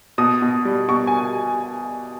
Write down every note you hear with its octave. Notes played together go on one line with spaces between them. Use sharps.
B2 D#6
B2
G3
B2 C#6
G#5